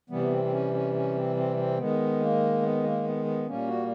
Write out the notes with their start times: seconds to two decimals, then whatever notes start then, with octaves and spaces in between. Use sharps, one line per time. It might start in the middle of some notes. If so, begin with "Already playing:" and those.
0.10 C3 E3 G3 B3
0.32 C4
0.45 C4
0.52 C#4
0.74 C#4
0.94 C#4
1.15 C4
1.36 C4
1.57 C4
1.78 D#3 G#3 B3
2.20 A#3
2.62 B3
2.84 A#3
3.04 B3
3.25 B3
3.46 A#2 G3 A#3 C#4
3.67 F#4